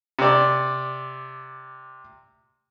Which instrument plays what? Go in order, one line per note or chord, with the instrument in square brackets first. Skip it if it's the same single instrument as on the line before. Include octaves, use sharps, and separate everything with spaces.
[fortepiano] C3 D5